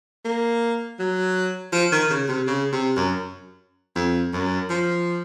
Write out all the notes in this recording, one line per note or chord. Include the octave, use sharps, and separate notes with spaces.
A#3
F#3
F3
D#3
C#3
C3
C#3
C3
F#2
F2
F#2
F3